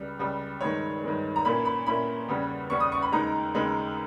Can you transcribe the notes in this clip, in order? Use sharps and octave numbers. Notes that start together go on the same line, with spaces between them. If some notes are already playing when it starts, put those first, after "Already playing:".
Already playing: C#2 C#3 G3
C#2 C#3 G3
G2 D#3 G#3 C#5
G2 D#3 G#3
A#5
A#2 A#3 C#4 E4 B5
B5
A#2 A#3 C#4 E4 B5
E2 C#3 G3 C#4
E2 C#3 G3 C#4 C#6
D#6
C#6
B5
D#2 C#3 G#3 D#4 A#5
D#2 C#3 G#3 D#4